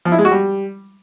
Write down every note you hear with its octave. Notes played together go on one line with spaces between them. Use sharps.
F3
E4
G#3
F#4
G3